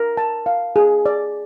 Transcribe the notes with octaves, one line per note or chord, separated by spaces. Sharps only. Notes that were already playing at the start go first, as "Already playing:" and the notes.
Already playing: A#4
A5
F5
G#4
D5